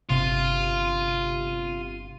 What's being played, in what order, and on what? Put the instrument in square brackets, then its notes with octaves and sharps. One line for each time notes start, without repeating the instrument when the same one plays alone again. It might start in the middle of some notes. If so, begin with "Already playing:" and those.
[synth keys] G1 C3 D#7 [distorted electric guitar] F4